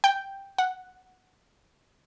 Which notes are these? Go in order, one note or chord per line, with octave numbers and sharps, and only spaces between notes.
G5
F#5